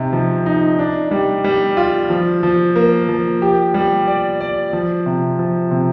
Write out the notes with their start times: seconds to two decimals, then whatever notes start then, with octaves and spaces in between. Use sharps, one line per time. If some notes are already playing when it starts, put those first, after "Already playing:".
Already playing: C3 D#4
0.13 F3
0.46 D#4
0.79 D4
1.11 G3
1.44 G3
1.77 F4
2.10 F3
2.43 F3
2.76 A#3
3.09 F3
3.42 G4
3.74 G3
4.07 D5
4.41 D5
4.73 F3
5.06 C3
5.39 F3
5.71 C3